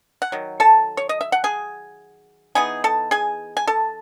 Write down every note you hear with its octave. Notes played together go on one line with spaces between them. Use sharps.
F#5
D#3 F#3
A4 A5
C#5
D#5
E5
F#5
G#4 G#5
E3 B3 D#4 G#4 G#5
A4 A5
G#4 G#5
G#5
A4 A5